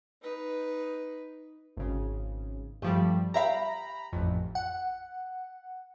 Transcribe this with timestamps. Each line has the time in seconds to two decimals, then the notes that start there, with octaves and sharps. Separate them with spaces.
0.22 D#4 B4
1.77 G#1 C#3
2.82 G2 F3 G3 A3
3.34 G4 E5 F5 A#5 B5
4.13 A1 F2
4.55 F#5